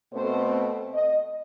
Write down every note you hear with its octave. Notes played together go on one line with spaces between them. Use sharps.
B2 A3 C4 C5
D#5